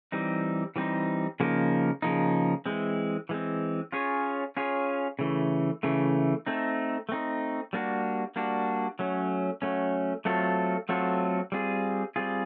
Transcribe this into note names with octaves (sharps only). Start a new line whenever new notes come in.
E3 G3 C4 D#4
E3 G3 C4 D#4
C#3 F3 A#3 D#4
C#3 F3 A#3 D#4
E3 G#3 C4
E3 G#3 C4
C#4 F4 G#4 C#5
C#4 F4 G#4 C#5
C#3 E3 A3
C#3 E3 A3
A3 C4 D#4
A3 C4 D#4
G3 A#3 D4 F#4
G3 A#3 D4 F#4
F#3 A3 C#4
F#3 A3 C#4
F#3 A3 C4 F4 A4
F#3 A3 C4 F4 A4
G3 C4 F4 G#4
G3 C4 F4 G#4